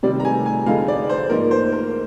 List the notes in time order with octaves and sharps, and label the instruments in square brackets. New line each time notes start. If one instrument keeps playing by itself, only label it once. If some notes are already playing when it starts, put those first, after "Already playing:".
[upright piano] C3 D#3 G3 D5
A#5
G#5
G#5
F2 D3 G#3 D#4 F5
D5
C5
G#2 F3 A#3 D#4 A#4
C5
A#4